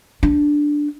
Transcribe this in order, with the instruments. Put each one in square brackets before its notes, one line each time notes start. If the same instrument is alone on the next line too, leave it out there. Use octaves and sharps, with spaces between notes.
[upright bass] D4